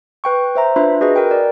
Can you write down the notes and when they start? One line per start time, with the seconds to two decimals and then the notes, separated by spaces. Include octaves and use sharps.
0.24 B4 G5 C#6
0.55 C5 E5 A#5
0.76 D4 F4 B4 E5 B5
1.01 F#4 G#4 B4 D#5
1.16 A#4 G5
1.31 A#4 D5